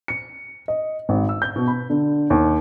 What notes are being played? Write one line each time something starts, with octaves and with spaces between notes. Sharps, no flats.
C#7
D#5
G#1
E6
G6
B2
B5
D3
D#2